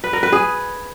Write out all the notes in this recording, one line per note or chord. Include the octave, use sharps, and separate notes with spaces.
B4
A#4
B4
G#4